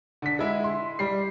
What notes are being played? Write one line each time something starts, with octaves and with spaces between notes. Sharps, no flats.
D3 B6
G#3 E4
C6
G3 C7